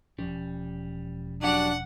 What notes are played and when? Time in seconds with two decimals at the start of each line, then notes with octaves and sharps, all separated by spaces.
0.19 E1 F3 G3 C#4
1.42 F#3 D4 G4 D5 F#5